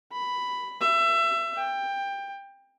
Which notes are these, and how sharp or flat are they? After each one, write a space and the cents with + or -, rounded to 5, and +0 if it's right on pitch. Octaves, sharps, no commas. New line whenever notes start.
B5 +5
E5 +25
G5 +20